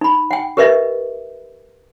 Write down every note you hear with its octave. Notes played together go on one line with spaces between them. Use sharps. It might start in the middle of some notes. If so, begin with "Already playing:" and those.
D#4 B5
F#5 G5
G4 A#4 B4 D#5 E5